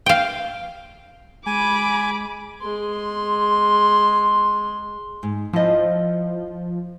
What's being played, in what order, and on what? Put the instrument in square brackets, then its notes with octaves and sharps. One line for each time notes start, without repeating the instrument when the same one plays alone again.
[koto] F5 G5
[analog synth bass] G#3 [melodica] G#5 [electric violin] B5 D6
[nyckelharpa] G#3 C6
[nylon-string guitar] G#2
[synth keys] F3 [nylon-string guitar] E4 D#5